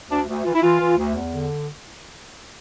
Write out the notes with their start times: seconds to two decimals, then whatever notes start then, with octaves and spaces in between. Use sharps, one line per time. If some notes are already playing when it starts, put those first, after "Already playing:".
0.10 D2 D4
0.27 D2
0.45 E3 F4
0.54 E4
0.62 E3 F4
0.80 E3
0.97 D2
1.15 E2
1.33 D3